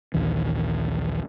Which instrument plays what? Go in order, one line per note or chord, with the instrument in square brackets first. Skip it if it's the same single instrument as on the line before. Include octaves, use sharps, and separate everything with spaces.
[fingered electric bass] A#1 D#2 E3